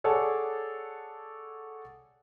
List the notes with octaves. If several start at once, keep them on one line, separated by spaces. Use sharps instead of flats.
G#4 A4 C#5 D5 F#5 A5